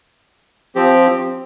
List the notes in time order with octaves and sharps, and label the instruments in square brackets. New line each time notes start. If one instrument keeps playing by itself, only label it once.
[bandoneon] F3 C4 G4